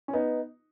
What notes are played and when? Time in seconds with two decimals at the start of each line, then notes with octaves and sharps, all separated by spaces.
0.08 C#4
0.13 B3 D#4